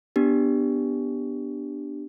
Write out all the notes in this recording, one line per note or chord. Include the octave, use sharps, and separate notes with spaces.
B3 D4 G4